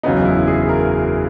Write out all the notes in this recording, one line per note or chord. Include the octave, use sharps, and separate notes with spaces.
F#1 E2 C#3 F#3 B3 D#4
E4
G#4
A#4